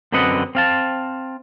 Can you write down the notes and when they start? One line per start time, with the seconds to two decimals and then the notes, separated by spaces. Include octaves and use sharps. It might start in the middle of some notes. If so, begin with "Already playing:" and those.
0.12 F#2 D3 C4 B4 D#5 F#5
0.55 C4 F5 A5